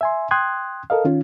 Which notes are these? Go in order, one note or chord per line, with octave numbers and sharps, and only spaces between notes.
E5 G#5 C6
G5 C6 D#6 F#6 G#6
A4 A#4 D#5 F5
D#3 C#4 F4